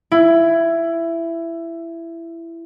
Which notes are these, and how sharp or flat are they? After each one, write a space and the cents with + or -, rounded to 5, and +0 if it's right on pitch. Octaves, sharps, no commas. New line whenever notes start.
E4 +15